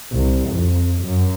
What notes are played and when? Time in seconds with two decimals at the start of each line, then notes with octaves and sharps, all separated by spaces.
0.15 C2
0.50 F2
1.04 F#2